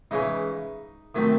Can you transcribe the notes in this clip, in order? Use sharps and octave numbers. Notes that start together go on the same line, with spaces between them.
C#3 E3 G#3 C#4 D#4
D#3 F#3 A3 C4